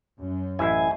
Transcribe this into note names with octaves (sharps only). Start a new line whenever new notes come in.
F#2
A1 E4 D#5 E5 G#5 C7